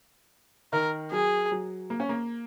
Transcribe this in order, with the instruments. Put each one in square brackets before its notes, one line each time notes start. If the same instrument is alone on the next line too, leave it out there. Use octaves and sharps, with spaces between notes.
[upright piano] D#3 [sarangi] A#4
[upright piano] F#3 [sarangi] G#4
[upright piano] F#3
A#3
C#4
A#3